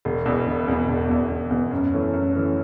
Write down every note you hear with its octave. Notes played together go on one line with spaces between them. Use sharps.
E1
E2 B2
E1
E2 B2
E1
E2 B2
E1
E2 B2
F#2
E3 A3 C#4
F#2
E3 A3 C#4